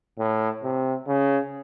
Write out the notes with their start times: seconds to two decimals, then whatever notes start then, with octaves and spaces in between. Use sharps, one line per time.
0.19 A2
0.63 C3
1.07 C#3